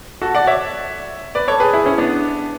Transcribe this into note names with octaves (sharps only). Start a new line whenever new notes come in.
F#4 A4
D5 F#5
C#5 E5
B4 D5
A4 C#5
G#4 B4
E4 G#4
C#4 E4
B3 D4